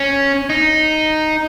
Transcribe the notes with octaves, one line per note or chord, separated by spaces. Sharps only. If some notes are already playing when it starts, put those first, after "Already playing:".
Already playing: C#4
D#4